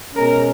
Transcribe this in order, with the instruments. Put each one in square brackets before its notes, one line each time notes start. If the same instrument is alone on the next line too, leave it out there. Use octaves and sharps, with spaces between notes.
[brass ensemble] B2 G#3 C#4 A#4